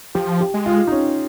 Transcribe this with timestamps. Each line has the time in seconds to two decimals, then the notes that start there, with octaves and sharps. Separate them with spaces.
0.15 F3 G4
0.40 G4
0.54 G#3
0.66 F4
0.87 D#4
0.92 C#4